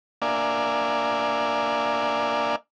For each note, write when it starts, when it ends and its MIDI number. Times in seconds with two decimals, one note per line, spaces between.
0.22 2.56 58
0.22 2.56 62
0.22 2.56 74
0.22 2.56 76
0.22 2.56 77
0.22 2.56 80